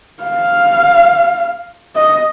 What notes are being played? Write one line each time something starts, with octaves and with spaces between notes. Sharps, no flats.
F5
D#5